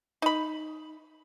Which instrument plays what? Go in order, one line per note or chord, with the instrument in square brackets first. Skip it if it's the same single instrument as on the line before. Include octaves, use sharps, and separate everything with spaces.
[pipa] D#4 B5